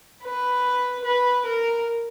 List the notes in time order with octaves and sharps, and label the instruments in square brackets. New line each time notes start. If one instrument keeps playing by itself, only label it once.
[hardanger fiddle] B4
B4
A#4